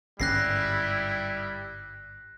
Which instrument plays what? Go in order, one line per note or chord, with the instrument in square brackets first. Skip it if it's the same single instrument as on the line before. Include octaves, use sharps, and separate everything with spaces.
[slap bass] G1 G#2 C#4 [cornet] G3 [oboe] E4 [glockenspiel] F#6 A#6 C7